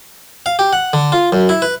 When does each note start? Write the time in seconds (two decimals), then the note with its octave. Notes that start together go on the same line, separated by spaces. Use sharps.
0.46 F5
0.59 G4
0.73 F#5
0.93 D3
1.12 F4
1.32 F#2
1.49 E4
1.62 B4